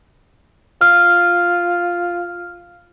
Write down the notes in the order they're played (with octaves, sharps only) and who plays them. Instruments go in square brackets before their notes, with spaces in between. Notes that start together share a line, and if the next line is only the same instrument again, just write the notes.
[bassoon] F4 [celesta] F6